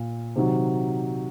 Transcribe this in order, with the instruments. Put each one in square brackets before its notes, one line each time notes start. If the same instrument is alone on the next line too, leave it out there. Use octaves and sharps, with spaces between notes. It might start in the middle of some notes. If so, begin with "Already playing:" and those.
Already playing: [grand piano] A#2
C3 D#3 F#3